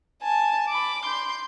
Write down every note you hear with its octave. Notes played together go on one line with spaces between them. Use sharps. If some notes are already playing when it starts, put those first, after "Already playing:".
G#5 A5
B5 D6
C6 G6